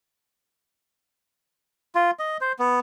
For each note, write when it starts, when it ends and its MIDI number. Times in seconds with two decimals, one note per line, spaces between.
1.95 2.11 65
2.19 2.37 75
2.41 2.52 72
2.59 2.80 59